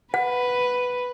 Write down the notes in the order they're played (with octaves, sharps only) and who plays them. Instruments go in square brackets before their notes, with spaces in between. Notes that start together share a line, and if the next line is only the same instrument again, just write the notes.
[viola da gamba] B4 [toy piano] F#5